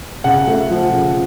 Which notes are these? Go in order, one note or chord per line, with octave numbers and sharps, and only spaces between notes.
C#3 F#5
A3
F3
C#3